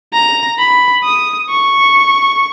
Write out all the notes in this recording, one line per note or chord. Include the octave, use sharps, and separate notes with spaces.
A#5
B5
D#6
C#6